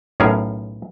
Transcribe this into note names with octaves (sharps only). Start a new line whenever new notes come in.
B1 A2 C#4 G#4 A#4 A#5